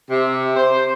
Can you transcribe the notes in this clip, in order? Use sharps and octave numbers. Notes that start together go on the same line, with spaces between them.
C3
C5